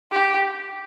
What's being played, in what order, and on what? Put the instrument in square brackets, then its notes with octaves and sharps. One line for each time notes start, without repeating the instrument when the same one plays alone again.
[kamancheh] G4